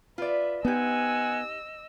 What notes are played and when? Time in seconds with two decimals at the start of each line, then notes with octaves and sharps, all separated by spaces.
0.18 F4 B4 D5 E5
0.65 B3 C4 D#4 G4 D#5 F#5 G#5 E6